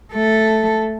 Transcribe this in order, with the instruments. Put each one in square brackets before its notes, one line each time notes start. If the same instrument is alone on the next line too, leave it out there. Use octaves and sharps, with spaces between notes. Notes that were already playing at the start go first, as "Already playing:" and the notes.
[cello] A3 A4